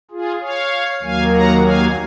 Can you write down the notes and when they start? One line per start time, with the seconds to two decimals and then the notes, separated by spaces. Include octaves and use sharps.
0.11 F4 G#4
0.41 C#5 F5
1.02 D#2 D#3 F#3 A#3 F5 G#5
1.33 F#5 A#5
1.64 F5 G#5